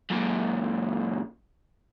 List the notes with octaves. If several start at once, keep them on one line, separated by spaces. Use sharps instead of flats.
F#2 A#2